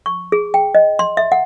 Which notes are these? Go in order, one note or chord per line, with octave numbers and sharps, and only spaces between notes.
C#6
G#4
G5
D#5
C6
E5
F#5